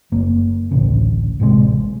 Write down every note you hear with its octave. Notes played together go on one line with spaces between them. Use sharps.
F#1 A#3
A1 D2 C#3
A1 C3 D#3 G#3